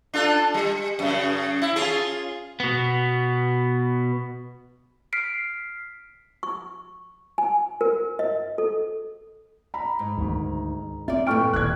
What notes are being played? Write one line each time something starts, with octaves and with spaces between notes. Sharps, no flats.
D4 F4 A4
G3
F#2 C#3
E4
C#4 F4 G#4
B2 B3
F6 B6 C7 D7
C#6
G#5
A#4
D#5
A4
A#5 B5
G#2
D2 D#3
C4 F4 D5 E5
E2 G2 A#2 A3 G5 C#6 F6 D7
D#1 F#6 G#6